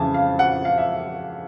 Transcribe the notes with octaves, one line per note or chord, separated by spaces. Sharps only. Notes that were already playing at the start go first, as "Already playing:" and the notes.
Already playing: F2 C#3 E3 G#5 A5
F5
F#5
F5
E5